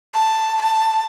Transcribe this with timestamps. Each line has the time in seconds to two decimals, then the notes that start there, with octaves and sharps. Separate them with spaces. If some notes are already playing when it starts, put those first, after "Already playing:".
0.14 A5
0.61 A5